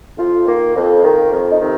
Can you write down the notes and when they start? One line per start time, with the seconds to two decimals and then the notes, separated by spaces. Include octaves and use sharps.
0.18 F2 F4
0.47 D#3 A#3
0.76 F2
1.03 D#3 A#3
1.31 F2 A#4
1.51 D#4
1.59 C3 D#3